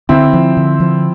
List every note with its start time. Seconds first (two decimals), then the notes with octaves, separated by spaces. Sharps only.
0.09 D3 C4 E4
0.33 F3
0.57 D3
0.80 F3